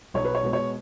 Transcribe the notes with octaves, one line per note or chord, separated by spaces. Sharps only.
B1 C#5
B4
C#5
B2 G#3 B3
C#5